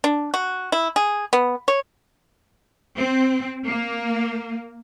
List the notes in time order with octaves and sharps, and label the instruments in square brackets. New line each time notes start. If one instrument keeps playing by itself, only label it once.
[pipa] D4
F#4
E4
G#4
B3
C#5
[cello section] C4
A#3